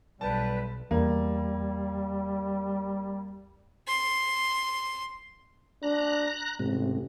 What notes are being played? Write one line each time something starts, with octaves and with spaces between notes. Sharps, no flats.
B1 G3 B4 A5
E2 G3 A#3
C6
D4 A#5 F#6
A1 G#2 C3